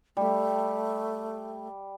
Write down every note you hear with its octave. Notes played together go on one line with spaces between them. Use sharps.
G3 A3 G4